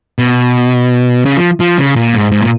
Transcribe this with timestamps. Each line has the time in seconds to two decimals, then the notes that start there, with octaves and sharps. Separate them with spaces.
0.19 B2
1.26 C#3
1.37 F3
1.60 F3
1.78 C#3
1.96 A#2
2.14 G#2
2.31 G#2
2.41 A#2